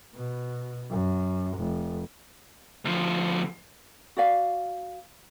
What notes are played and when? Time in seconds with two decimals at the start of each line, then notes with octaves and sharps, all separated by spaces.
0.15 B2
0.90 F#2
1.58 F1
2.85 D2 F3
4.17 F#4 D5 F5